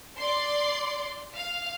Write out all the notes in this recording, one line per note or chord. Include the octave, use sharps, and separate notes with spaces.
D5 C6
F5